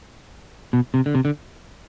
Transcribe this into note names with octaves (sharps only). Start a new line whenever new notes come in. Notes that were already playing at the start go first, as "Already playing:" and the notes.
B2
C3
D3
C3
D3